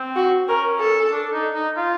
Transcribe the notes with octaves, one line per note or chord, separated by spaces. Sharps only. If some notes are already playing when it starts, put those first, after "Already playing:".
Already playing: C4
F#4
C#4 A#4
A4
D4
D#4
D#4
F4